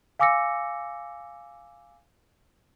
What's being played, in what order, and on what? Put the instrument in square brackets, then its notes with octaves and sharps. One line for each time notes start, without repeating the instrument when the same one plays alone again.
[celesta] F5 G#5 D6 E6 A#6 C#7